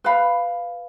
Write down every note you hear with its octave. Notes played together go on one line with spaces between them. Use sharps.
B4 F5 B5